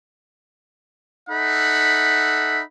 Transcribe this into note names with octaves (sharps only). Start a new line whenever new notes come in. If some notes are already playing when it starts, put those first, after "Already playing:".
D#4 A4 E5 F#5 B5